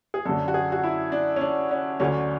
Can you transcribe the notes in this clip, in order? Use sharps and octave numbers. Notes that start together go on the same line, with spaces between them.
G#4
F#2 D3 F#3 A4
F#4
G#4
F#4
E4
D4
C#4
D4
C#4
D2 D3 F#3 C#4